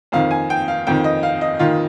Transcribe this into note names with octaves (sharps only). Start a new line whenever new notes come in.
F2 D#3 F5
G#5
G5
F5
F2 D#3 G5
D#5
F5
D#5
D#3 F4